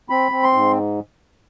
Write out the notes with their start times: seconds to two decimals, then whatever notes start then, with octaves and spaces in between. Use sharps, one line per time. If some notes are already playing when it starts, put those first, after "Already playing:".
0.10 C4 B5
0.32 C4
0.43 C6
0.53 G#2